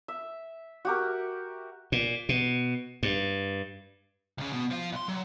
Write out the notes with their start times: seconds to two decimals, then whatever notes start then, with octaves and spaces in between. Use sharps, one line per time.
0.08 E5
0.85 F#4 G4 A#4
1.92 A#2
2.29 B2
3.03 G2
4.38 C#2 C#3
4.53 B2
4.71 F3 F4
4.92 B1 C6
5.08 F#3